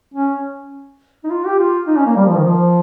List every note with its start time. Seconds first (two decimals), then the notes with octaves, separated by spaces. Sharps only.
0.14 C#4
1.24 D#4
1.30 F4
1.46 G4
1.59 F4
1.87 D#4
1.97 C#4
2.06 A#3
2.16 G3
2.26 F3
2.35 D#3
2.44 F3